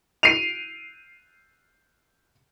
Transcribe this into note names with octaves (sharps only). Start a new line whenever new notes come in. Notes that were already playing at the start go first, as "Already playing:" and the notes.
C7 D7 D#7 F7